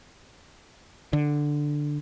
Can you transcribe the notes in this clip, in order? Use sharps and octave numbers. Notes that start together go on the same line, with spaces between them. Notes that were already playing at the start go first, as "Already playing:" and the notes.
D3